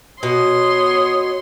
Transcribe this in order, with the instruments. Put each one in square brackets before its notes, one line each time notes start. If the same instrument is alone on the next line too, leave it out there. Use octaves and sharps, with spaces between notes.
[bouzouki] B2 [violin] C#5 C6 [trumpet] D#6